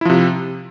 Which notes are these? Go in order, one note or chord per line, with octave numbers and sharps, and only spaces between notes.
C3 F3 E4